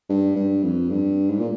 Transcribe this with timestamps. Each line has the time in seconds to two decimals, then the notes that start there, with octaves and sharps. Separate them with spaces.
0.09 G2
0.36 G2
0.63 F2
0.90 G2
1.30 G#2
1.39 A#2